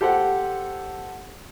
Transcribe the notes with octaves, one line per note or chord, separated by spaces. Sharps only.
G4 A4 C5 F#5